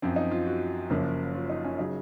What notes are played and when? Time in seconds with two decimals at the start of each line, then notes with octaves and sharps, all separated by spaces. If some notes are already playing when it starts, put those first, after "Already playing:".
0.02 F#2 F3 C4
0.16 D#4
0.31 F4
0.46 F#4
0.90 F#1 F#2 F3 A#3
1.34 F4
1.50 D#4
1.65 C#4
1.79 C#3 F#3 D#4